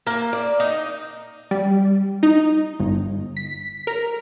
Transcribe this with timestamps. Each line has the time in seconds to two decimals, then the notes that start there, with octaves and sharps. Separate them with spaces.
0.07 A#3
0.33 D5
0.60 D#4
1.51 G3
2.23 D#4
2.79 G1
3.37 B6
3.87 A#4